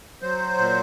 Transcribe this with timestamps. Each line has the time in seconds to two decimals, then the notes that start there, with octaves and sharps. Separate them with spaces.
0.22 F#3 C5
0.58 A#2